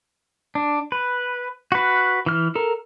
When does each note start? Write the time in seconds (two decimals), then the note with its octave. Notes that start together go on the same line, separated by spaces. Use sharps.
0.55 D4
0.92 B4
1.72 F#4 B4
2.26 E3 F6
2.55 A4 A#4